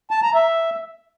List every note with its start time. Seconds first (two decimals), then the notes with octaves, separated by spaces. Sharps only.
0.11 A5
0.23 A#5
0.34 E5